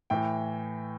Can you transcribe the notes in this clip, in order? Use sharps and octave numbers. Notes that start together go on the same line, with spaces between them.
A2 E3 G5